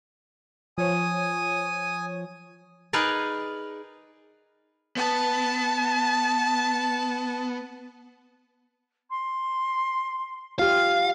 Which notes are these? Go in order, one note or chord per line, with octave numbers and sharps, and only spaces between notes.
F3 C#5 G#5 D#6
D#4 G#4 A#4 B4 D5
B3 A5
C6
F4 G4 F5 F6